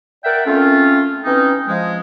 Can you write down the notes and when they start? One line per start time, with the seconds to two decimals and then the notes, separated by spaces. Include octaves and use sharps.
0.23 A#4 D5 E5 F#5 G5
0.46 A3 C4 C#4 F4
1.25 E3 C4 C#4 D#4
1.68 F3 G#3